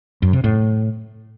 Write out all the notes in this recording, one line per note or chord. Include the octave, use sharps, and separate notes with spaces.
F#2
C3
A2